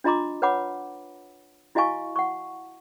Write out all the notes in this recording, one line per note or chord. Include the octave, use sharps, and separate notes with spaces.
D4 F4 D#5 A#5 C6 D6
B4 C#5 F#5 B5 D6
E4 F#4 D#5 F5 G#5 C#6
F#5 C#6